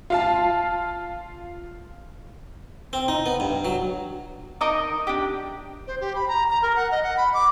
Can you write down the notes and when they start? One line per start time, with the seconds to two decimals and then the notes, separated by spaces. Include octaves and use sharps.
0.10 F4 F5 A5
2.93 C4
3.08 D#4
3.26 B3
3.40 G2
3.65 F#3
4.61 D#4 A#4 D#5 D6
5.07 D4 G4
5.87 C5
6.01 G4
6.15 B5
6.28 A#5
6.50 A#5
6.62 A#4
6.76 F#5
6.91 D#5
7.03 F#5
7.17 B5
7.34 D6